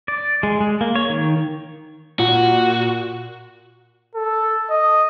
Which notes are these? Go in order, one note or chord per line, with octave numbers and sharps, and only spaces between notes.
D5
G#3
G#3
A#3
C#5
D#3
A#2 F4 F#4
A4
D#5